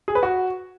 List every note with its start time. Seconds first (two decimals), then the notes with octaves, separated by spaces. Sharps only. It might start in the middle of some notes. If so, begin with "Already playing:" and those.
0.08 G#4
0.15 B4
0.23 F#4